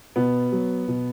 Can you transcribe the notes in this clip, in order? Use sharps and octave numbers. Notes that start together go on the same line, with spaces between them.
B2 B3
F#3
B2